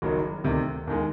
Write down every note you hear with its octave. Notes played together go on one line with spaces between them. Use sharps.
F#1 F#2 D#3 F#3
D2 C3 D#3
D#2 D#3 G#3